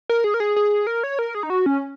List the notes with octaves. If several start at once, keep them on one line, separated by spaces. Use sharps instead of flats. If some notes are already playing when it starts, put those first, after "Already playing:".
A#4
G#4
A#4
G#4
G#4
A#4
C#5
A#4
G#4
D#4
F#4
C#4